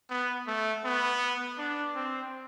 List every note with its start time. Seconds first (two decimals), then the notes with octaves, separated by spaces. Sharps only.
0.10 B3
0.47 A3
0.84 B3
1.58 D4
1.95 C4